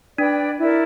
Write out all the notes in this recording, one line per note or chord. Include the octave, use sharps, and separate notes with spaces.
D4 B4 D5 G5
E4 A#4 D5